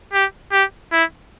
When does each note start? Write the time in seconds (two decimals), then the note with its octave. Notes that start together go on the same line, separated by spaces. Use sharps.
0.13 G4
0.52 G4
0.92 E4